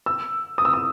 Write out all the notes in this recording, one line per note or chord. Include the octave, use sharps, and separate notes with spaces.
E6
D#6
E6
D#6